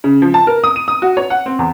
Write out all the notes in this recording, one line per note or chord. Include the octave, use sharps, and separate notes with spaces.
C#3
F3
A5
A#4
D#6
D#7
D#6
F#4
C#5
F#5
C4
E2